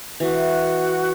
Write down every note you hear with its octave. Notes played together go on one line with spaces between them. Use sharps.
E3 F#4